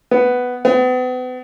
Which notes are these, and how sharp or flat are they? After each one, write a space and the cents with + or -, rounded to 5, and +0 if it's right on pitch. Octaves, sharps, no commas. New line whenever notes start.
B3 +5
B3 +40